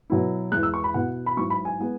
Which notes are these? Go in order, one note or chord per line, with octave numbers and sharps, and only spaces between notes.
B2 F#3 E4
E2 E3 G#3 F#6
E6
C#6
B5
B2 B3 E4 F#5
B5
G#2 F#3 E4 C#6
B5
G#5
G#3 B3 E4